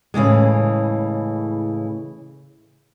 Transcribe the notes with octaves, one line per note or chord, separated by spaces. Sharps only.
A2 C#3 E3 G#3